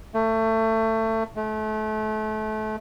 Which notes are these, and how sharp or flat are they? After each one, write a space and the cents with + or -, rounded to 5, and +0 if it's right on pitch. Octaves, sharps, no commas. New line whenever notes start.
A3 +25
A3 -30